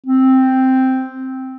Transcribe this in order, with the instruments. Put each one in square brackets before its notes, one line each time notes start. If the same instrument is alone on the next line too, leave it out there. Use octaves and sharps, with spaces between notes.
[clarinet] C4